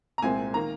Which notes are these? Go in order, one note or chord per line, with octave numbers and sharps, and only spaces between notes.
A#5
C2 A#2 G#3 C4 G#5
D#3 A#3 A#5